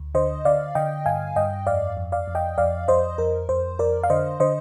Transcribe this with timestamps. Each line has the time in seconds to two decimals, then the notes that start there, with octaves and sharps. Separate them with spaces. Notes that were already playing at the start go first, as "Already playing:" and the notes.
Already playing: D2
0.15 D3 C5 D#5
0.45 D3 D5 F5
0.75 D3 D#5 G5
1.06 G2 F5 G#5
1.36 G2 D#5 G5
1.67 F2 D5 F5
1.97 F2
2.12 D5 F5
2.28 F2
2.35 D#5 G5
2.58 F2 D5 F5
2.88 F2 C5 D#5
3.18 F2 A#4
3.49 F2 C5
3.79 F2 A#4 D5
4.04 F5
4.10 D3 C5 D#5
4.40 D3 C5 D#5